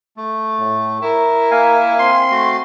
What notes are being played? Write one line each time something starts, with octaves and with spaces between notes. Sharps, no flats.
A3
A2
E4 A#4
A#3 F5 G#5
C4 C6
A3 F#4